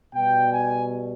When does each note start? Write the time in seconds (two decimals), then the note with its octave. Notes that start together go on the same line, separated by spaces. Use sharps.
0.13 B2 G3 G5
0.52 G#5